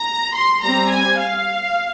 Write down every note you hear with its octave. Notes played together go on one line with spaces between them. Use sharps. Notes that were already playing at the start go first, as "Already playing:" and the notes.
Already playing: A#5
C6
G3 C4 A#5
G#5
F5